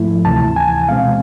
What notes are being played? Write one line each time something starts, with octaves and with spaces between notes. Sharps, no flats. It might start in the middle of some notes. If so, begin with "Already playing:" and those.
Already playing: G#2 F3 A3 E4
D2 C3 E3 A5
G#5
B2 G#3 C4 F5